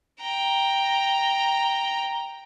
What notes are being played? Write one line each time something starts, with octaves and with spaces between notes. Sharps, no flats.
G5 A#5